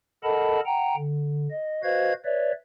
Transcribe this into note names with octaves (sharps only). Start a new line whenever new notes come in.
A4 A#4 D#5 F#5 A5 B5
F#5 G5 A#5
D3
D#5
F#4 B4 C5 D#5 F5 G#6
B4 C#5 D5 E5